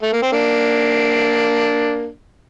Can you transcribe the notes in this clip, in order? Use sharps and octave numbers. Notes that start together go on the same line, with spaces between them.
A3
A#3
C4
A#3 D4